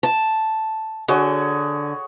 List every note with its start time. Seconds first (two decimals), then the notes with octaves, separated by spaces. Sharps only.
0.03 A5
1.08 D3 F#4 G#4 C#5